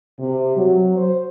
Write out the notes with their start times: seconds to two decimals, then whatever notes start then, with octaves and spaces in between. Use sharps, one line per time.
0.19 C3
0.56 F#3
0.97 C5